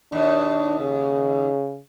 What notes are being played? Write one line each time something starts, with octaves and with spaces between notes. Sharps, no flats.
D#2 B2 D4
C#3